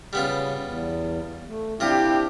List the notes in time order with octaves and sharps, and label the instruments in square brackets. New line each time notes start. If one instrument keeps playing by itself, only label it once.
[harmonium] C#3 [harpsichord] G3 B3 F4
[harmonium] E2
A3
[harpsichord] C3 F4 D#6 [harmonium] C4 D4 [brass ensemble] E4 G4